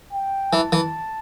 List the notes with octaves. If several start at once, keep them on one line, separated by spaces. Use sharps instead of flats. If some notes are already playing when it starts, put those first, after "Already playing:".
G5
E3 A5
E3